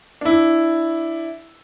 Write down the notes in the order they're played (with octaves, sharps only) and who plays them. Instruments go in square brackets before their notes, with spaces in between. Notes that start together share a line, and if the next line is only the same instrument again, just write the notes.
[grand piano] D4 E4